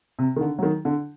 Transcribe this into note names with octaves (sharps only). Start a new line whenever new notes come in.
C3
D#3
D3
F#3
D#3
D3